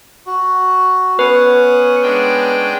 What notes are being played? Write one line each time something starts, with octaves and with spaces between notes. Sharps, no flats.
F#4
B3 C#4 B4 F#5 G#5
G#3 D4 G5